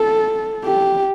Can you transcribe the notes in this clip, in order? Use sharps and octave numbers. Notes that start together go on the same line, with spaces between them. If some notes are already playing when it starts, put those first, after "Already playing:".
Already playing: A4
G4